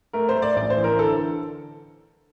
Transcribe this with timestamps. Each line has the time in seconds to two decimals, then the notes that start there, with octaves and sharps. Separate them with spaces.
0.13 A3 A#4
0.29 C5
0.36 A3
0.42 D5
0.56 A1 D5
0.70 C5
0.77 E3
0.84 A#4
0.99 D3 A4